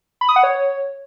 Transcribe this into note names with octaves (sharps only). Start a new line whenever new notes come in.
B5
D#6
F#5
C#5